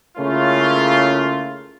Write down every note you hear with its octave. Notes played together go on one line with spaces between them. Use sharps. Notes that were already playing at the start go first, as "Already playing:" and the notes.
C#3 A3 A#3 C#4 E4 F4